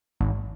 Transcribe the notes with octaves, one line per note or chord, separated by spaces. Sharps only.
G#1